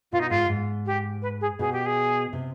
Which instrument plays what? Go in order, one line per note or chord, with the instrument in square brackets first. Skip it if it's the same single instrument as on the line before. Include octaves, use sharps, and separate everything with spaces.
[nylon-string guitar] B2 [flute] F4
[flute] D#4
[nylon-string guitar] G#2 [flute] F4
[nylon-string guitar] G#2
[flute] G4
B4
G#4
[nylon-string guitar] B2 [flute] G#4
[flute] G4
G#4
[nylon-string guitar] C3